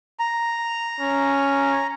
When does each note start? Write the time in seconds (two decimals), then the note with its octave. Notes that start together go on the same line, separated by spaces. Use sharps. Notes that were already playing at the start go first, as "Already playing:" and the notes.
0.19 A#5
1.00 C#4